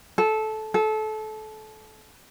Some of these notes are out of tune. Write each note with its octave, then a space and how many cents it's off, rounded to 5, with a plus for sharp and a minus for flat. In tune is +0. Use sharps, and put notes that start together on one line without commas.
A4 -15
A4 -25